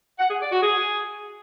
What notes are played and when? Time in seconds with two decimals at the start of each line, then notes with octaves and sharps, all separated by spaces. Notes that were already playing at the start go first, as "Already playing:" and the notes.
0.19 F#5
0.30 G#4
0.41 D5
0.52 F#4
0.63 G#4